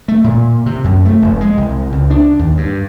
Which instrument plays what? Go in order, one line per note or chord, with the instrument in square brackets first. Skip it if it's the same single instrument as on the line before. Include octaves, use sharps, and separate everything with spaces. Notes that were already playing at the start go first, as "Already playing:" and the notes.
[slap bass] A3
A#2
C3
F#2
A3
F1
G#3
C2
C#2
D4
D#2
G2